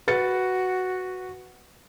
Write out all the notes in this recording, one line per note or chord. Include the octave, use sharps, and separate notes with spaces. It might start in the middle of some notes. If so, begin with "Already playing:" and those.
F#4 B4 A6 C#7